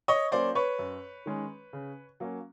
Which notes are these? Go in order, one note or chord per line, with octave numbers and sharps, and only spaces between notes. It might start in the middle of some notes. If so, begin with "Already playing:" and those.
C#5 D#5
F#3 A#3 C#4 C5 D5
B4 C#5
F#2
D#3 G#3 C#4
C#3
F#3 A#3 C#4